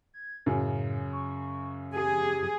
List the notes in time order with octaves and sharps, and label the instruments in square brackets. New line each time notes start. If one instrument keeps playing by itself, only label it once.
[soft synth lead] G#6
[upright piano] F#2 C#3 [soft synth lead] A2
[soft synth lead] C#6
[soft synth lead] G4 [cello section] G#4